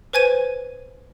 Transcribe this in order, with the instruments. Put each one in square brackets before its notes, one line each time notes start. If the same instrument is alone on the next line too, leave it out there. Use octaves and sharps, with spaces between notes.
[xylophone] B4 C5 G#5 G#6 D#7